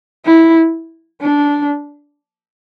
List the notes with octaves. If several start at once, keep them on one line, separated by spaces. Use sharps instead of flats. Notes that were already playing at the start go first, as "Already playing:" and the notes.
E4
D4